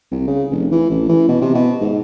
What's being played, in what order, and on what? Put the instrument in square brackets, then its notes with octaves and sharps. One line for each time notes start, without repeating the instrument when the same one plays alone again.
[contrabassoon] C2
C#3
F1
E3
A1
E3
B2
C3
B2
G#2